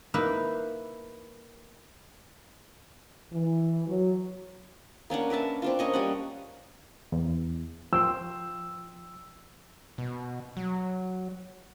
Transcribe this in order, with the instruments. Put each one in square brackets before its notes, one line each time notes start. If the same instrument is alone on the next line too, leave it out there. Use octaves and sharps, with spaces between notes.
[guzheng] A#3 D#4 E4 B4 E5
[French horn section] E3
F#3
[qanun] A#3 C#4 D4 F#5
A#4 B4 E5 A5
C4 D4 F4
A#3 C#4 D#5 C#6
G3 C#4 F#5
[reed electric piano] E2
[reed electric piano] F3 G5 C6 [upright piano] E6
[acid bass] B2
F#3